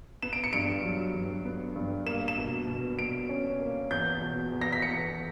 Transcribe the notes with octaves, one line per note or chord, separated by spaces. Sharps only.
B3 E7
D7
C#7
G2 D7
F#3
G2
B3
G2
A#3 E7
E7
B2
B2
B2 D7
C#4
A#3
E2 G6
B2
E2
A#6
B6
E2 C#7